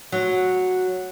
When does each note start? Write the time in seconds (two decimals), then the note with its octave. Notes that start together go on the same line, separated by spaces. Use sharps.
0.12 F#3